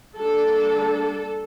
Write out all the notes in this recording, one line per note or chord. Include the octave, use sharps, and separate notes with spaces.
G3 A#3 D4 A4